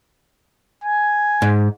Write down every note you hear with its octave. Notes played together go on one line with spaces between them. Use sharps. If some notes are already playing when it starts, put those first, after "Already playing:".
G#5
G#2